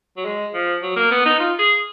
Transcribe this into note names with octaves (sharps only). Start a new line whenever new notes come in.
F#3
G#3
F3
F#3
A#3
B3
D#4
F4
G#4